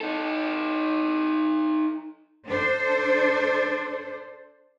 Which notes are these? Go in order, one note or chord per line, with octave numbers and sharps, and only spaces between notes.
D#4 A4
D4 A4 C5